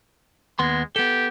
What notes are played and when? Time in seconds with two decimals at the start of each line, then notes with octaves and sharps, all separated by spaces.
0.59 D#2 G#3 B3 C6
0.96 B3 G4 A4